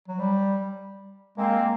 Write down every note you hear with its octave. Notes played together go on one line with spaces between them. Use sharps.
F#3
G3
G#3 A#3 C4